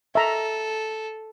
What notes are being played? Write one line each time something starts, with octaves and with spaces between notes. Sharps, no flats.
A4 E5 A#5